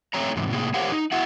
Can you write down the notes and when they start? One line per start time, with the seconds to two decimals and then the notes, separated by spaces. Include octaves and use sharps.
0.14 A3 C4 C#5 A#5
0.36 E2 G#2 C3
0.50 A2 C3 E3 A#3 G#4
0.74 G4 A#4 C5 C#5 F5 F#5
0.92 D#4
1.12 E4 F#4 E5 F#5